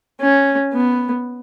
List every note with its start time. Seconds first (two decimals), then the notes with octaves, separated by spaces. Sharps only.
0.20 C#4
0.74 B3